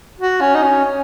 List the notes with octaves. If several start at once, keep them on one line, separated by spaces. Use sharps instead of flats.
F#4
C#4
D#4
C#4
C#4